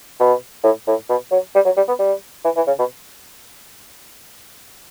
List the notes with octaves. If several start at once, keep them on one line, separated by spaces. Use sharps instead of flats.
B2
A2
A2
B2
F#3
G3
F#3
G3
B3
G3
E3
E3
C#3
B2